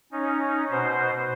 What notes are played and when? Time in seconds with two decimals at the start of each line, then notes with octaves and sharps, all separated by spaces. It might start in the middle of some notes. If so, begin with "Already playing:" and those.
0.12 C#4 D#4
0.71 B2 C5